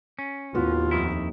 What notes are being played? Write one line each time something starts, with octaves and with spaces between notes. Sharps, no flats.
C#4
D#2 A2 B3 F4 F#4
F2 D#3 E4